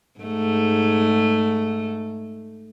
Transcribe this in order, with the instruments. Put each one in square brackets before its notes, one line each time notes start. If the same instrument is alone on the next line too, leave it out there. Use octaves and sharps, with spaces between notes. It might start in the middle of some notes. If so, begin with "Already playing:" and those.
[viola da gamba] G#2 A3